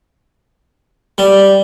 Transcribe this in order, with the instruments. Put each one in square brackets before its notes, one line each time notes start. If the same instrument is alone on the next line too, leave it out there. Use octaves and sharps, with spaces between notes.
[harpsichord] G3